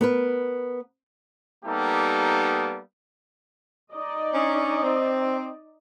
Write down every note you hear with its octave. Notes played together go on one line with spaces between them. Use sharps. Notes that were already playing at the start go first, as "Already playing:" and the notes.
B3 A#4 B4
G3 A#3 B3 D#4 G4 A4
D#4 D5 D#5
C#4 D4
C4